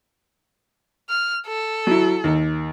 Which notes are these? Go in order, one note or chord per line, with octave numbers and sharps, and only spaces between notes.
F6
A4
F#3 E4
D#2